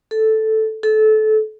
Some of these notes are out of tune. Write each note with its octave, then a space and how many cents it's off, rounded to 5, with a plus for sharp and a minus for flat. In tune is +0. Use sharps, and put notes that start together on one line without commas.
A4 -5
A4 -25